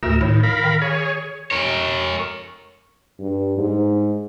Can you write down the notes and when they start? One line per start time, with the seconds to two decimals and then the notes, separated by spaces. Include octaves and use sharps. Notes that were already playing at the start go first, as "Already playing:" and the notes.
0.03 D2 A2 A#4 E6
0.21 A2 D#3
0.43 A#4 F5 B5
0.64 D#3
0.82 G#4 C#5
1.51 A#4 C#5
3.19 G2
3.58 G#2